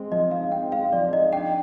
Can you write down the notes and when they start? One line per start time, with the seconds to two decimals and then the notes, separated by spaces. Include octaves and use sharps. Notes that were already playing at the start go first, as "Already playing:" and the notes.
Already playing: G#3 C4
0.11 F3 D#5
0.31 D#4 F5
0.51 C4 G5
0.72 G#3 F5
0.92 F3 D5
1.13 D#4 D#5
1.32 D4 G5